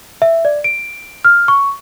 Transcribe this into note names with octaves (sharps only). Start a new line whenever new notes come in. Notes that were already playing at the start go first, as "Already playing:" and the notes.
E5
D5
D7
F6
C#6